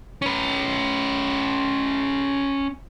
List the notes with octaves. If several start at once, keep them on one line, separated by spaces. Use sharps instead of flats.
C#4 B4